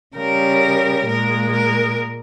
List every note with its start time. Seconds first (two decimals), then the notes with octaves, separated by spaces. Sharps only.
0.15 C#3 G3 A#4
1.07 A#2 G#3 A#4
1.52 A#4